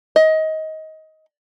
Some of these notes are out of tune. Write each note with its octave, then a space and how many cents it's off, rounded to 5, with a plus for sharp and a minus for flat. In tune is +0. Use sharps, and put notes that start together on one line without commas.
D#5 +20